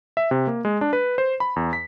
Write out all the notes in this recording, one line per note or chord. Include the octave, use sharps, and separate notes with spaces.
E5
C3
A#3
G#3
D4
B4
C5
B5
E2
B6